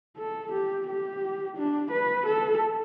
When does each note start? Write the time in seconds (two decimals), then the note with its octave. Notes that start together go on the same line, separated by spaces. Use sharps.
0.17 A4
0.51 G4
0.87 G4
1.57 D4
1.91 B4
2.26 A4